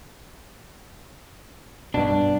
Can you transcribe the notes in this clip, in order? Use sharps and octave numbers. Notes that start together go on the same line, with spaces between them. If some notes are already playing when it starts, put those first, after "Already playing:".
G2 B2 D4